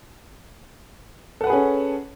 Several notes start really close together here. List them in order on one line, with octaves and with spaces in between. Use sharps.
A4 F#5 B4 G#4 C#4